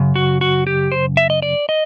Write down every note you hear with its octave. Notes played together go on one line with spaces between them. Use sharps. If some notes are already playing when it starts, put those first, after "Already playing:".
Already playing: F#2 C#3
F#4
F#4
G4
C5
E5
D#5
D5
D#5